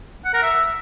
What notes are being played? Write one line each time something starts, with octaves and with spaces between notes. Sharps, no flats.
F#5
A#4
E5